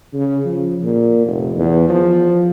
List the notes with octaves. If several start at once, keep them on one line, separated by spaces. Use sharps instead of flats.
C#3
F3
A#2
F1
E2
F3